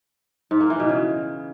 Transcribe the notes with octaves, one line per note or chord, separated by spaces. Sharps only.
G#2
A#3
E3
B2
C#3